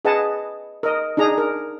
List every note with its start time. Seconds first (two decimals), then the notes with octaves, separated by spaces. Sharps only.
0.05 G#4 B4 D#5 F#5 A5
0.83 A#4 D#5
1.17 D4 D#4 G#4 A#5
1.38 A#4